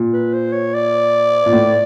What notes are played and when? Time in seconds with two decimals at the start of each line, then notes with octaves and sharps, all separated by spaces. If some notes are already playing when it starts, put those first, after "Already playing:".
Already playing: A#2
0.13 B4
0.33 C5
0.53 C#5
0.74 D5
1.46 A#2
1.53 A2